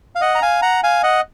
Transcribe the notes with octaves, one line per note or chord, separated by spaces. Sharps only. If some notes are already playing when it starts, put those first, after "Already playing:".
F5
D#5 F#5
A#5
F5 G#5
F#5 A#5
F5 G#5
D#5 F#5